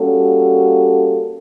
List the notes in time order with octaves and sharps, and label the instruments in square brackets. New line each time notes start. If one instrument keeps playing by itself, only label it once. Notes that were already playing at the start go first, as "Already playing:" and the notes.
Already playing: [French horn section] G3 A#3 C#4 F#4 A4